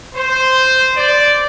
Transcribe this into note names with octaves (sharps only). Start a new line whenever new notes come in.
C5
D5